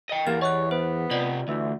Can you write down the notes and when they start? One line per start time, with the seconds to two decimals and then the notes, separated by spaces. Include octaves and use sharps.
0.09 D#5 G5
0.27 E2 A#3 G4 A6
0.41 C#5 D#5 E5 F#6
0.71 B3 C5
1.11 C3 F4 D5 D#5 F#5
1.48 D2 E3